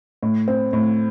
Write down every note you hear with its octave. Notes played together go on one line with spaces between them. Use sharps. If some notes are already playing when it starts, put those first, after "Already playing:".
A2
C4
A2